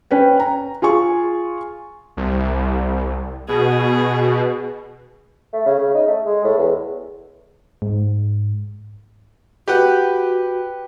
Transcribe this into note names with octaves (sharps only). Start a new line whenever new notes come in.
C#4 B4 G5
A#5
F4 G#4 G#5 C#6
C2
B2 G#4
A3
C#3
C#3
D#4
A3
G#3
A2
E2
G#2
F#4 G4 B4 F#5